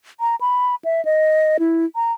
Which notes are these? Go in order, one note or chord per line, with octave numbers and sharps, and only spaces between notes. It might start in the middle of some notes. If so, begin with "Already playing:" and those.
A#5
B5
E5
D#5
E4
A#5